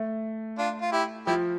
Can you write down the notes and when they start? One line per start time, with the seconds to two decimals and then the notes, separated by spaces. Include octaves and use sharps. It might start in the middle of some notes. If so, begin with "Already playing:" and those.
Already playing: A3
0.58 D4 F4
0.81 F4
0.92 E4 G4
1.27 F3 E4 G4